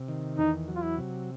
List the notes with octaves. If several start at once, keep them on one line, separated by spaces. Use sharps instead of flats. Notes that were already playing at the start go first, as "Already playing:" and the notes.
Already playing: C3
D#3
E2 D#4
F#3
F4
E4
C3